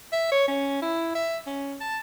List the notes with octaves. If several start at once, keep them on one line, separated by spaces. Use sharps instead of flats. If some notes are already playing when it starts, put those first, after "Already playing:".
E5
C#5
C#4
E4
E5
C#4
A5